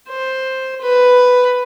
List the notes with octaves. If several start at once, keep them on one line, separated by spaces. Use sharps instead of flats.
C5
B4